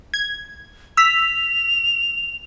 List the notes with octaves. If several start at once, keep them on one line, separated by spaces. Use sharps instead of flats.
G#6
E6 B6 F7